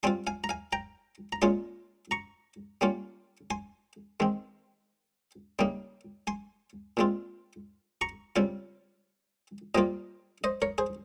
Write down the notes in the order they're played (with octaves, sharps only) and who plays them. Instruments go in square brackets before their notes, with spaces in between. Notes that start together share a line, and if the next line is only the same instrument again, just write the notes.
[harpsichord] G3 C4 F4 G#5 C6
F5 G#5
A#5
F5 G#5
G5 A#5
A#5
A#2 G#3 C#4 F4 G#5 C6
A#5 C#6
G3 A#3 C#4 F4
G#5 C6
D#3 G#3 C4
C#3 G3 A#3 D#4
G#5 C6
A#2 G#3 C4 F4
A#5 C#6
C#3 G3 C4 F4
A#2 G3 A#3 F4 C5 D#5
C5 D#5
A#4 C#5
G#4 C5